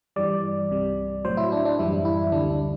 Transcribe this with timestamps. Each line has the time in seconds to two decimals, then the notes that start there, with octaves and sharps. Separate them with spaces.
0.16 G2 E3 G3 D5
0.71 C2 C3 G3
1.25 A2 F#3 C5
1.37 E4
1.52 D4
1.65 D4
1.79 F#2 E3 G3 E4
2.05 E4
2.32 D2 D3 G3 D4
2.50 D4